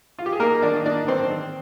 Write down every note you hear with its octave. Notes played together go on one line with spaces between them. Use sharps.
F4
G4
G#4
A#3 D#4 A#4
D#3 D4 D5
D#5
A#3 D4 D5
D#3 C4 C5
C4